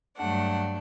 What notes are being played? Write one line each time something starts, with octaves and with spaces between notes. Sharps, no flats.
G2 F#3 A3 D4 F#5